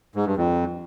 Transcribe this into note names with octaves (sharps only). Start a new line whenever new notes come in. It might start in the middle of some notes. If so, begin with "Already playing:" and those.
G#2
G2
F2